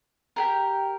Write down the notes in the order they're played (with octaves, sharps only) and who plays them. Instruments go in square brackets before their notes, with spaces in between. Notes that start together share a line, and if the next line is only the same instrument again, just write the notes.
[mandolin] G4 G#4 A#4